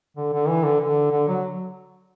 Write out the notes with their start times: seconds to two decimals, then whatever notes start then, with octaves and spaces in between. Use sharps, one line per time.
0.17 D3
0.33 D3
0.48 E3
0.64 D3
0.80 D3
1.12 D3
1.28 F#3